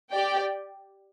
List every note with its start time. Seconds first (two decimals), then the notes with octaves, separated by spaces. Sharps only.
0.11 G4 D5 G5